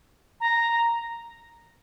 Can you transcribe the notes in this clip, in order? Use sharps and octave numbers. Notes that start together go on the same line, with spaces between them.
A#5